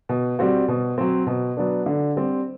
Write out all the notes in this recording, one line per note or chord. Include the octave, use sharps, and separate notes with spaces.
B2
G3 C4 F#4
B2
F#3 C4
B2
F#3 B3 D4
D3
G3 C4